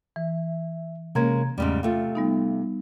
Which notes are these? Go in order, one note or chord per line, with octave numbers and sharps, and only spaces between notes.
E3 E5
C3 G#3 A#3 C#4 A#5 G#6
E2 G#2 C#3 G3 A3
C3 A3 F4 F5
G3 B3 D#4